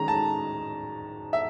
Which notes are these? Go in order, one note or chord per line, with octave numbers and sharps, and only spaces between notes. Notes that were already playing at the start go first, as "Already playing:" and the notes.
Already playing: D#3 G#3 C#4 A#5
A5
E5